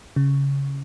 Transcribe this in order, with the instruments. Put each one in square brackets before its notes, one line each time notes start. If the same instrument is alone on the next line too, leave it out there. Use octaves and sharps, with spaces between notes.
[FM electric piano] C#3